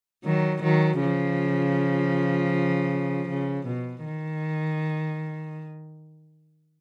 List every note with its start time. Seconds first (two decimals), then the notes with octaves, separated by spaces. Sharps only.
0.25 D#3 F#3
0.63 D#3 F#3
1.01 C#3 F3
3.29 C#3
3.67 B2
4.04 D#3